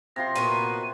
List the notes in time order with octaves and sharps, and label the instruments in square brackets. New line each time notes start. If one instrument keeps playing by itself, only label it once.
[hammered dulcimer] C3 F3 C6 [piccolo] A#6
[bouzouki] A#2 B3 F#4 [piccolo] D#7